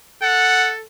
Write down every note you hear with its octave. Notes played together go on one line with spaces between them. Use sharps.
A4 F#5